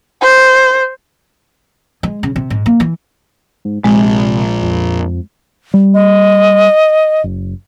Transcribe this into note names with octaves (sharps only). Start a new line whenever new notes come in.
C5
G#3
C#3
C3
G#2
A#3
E3
G#2
A#1 C3 G#3
F2
G3
D#5
F#1